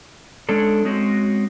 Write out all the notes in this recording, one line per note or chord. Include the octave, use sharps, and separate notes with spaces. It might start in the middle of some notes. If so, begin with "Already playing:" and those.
G#3 C#4 D4 A4
G#3 C4 C#4 F#4